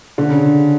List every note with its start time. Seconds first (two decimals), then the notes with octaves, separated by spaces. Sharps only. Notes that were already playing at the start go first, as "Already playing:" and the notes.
0.18 D3
0.29 C#3